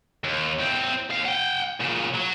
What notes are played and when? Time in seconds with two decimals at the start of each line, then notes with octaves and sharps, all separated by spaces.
0.24 D#2
0.59 E2 C4
1.10 D#2 F5
1.25 F#5 G5
1.80 A#2 C#3
2.15 F#3